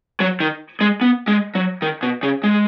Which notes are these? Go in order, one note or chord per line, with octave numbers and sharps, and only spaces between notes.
F#3
D#3
G#3
B3
G#3
F#3
D#3
B2
C#3
G#3